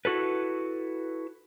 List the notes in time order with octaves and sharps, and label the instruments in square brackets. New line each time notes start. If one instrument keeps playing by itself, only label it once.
[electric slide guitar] E4 F#4 A4 B4